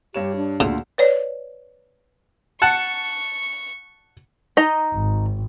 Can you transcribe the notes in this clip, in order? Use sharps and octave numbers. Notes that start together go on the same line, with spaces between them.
G2 G4 C#5 E7
D4
D2 A#2 C#3
B4 C#5 D5
F#5 A5 C#6
D#4 D#5 A#5
G#1